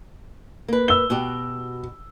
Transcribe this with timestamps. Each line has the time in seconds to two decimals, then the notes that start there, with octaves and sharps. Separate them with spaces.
0.68 A#3 B4
0.88 E6 G7
1.10 B2 F#4 G4